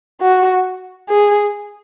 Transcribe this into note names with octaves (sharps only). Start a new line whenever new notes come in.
F#4
G#4